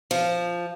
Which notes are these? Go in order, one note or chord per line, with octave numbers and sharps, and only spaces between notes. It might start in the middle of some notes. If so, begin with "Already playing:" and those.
F3